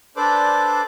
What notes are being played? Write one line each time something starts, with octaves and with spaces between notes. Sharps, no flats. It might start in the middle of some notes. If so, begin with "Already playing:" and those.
D4 A4 B4 C5 D5 D6